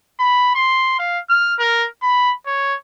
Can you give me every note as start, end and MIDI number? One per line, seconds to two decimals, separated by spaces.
0.20 0.54 83
0.55 0.97 84
0.99 1.19 77
1.29 1.54 89
1.59 1.87 70
2.03 2.33 83
2.47 2.75 73